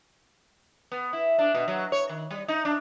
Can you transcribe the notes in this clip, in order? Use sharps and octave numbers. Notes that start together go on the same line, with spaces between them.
B3
E4
D4
B2
F#3
C#5
D#3
G3
D#4
D4